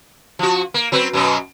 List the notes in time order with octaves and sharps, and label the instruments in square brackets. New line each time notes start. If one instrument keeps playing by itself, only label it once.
[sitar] F3 F#4
A#3
F#3 C4 B4
F#2 B2 F#3